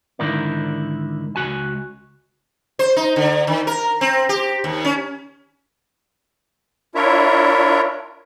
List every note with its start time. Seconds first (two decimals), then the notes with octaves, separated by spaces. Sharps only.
0.19 G#2 D3 D#3 E4 A#4 D5
1.36 C#2 F#2 F#4 G#5
2.79 C5
2.97 D#4
3.16 D3
3.47 D#3
3.67 A#4
4.01 C4
4.29 G4
4.64 D#2
4.85 C#4
6.95 D4 E4 F4 A#4 C#5 E5